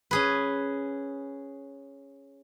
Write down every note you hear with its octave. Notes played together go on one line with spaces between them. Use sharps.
C#4 G#4 B4